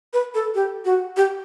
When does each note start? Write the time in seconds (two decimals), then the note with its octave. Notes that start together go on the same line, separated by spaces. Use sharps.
0.13 B4
0.35 A4
0.55 G4
0.85 F#4
1.17 G4